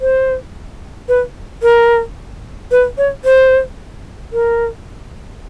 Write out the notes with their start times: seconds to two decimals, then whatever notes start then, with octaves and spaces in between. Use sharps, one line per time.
0.01 C5
1.08 B4
1.63 A#4
2.71 B4
2.98 C#5
3.25 C5
4.33 A#4